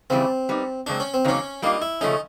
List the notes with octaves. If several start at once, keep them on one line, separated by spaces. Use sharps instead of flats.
C#3 E3 G3 C4
G3 B3 D#4
F#2 C#3 G#3 C4 D4
C#4
C4
E2 C#3 F#3 A#3 C#4 D#4
G3 A#3 D4 D#4 F4
E4
C#3 F3 A3 C#4 D#4